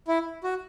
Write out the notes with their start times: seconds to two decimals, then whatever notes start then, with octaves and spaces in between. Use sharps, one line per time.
0.08 E4
0.44 F#4